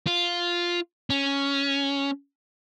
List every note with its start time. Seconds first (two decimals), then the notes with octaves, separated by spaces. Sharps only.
0.07 F4
1.10 C#4